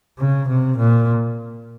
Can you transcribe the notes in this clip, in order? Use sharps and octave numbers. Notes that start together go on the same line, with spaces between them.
C#3
C3
A#2